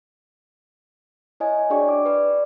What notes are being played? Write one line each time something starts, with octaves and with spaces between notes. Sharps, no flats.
E4 C#5 D#5 G#5
D4 F#4 G#4 D5 G5 C#6
D6
B4 D5